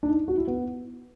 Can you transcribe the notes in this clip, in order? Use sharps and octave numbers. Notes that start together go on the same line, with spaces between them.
D4
D#4
F#4
E4
B3